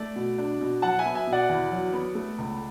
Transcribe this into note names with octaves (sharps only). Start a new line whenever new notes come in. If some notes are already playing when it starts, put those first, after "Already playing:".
Already playing: A3 D5
B2
D4
B2
F#3 F#5 A5
E5 G#5
B3
E5 G#5
B2
D5 F#5
E2
F#3
B3
A3
C#2